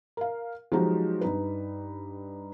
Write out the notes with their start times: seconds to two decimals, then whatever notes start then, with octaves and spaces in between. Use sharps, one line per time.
0.17 A#4 F5
0.72 F3 F#3 G#3 D#4 F#4 G4
1.21 G2 D#4 B4